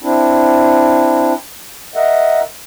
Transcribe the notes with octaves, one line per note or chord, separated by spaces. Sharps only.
C4 D4 E4
A#4 D#5 E5 F#5